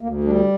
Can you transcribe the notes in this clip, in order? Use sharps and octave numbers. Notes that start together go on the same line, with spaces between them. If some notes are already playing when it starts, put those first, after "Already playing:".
D2 A#3
G3 D4